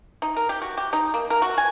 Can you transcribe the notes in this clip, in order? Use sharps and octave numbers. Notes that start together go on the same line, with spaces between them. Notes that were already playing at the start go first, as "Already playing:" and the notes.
D#4
A#4
G4
F#4
G4
D#4
A#3
A#4
F#4
G#5